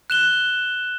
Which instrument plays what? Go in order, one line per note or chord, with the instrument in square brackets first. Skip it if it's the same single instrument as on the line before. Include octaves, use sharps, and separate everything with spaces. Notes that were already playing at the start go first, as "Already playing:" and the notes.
[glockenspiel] F#6 E7 G7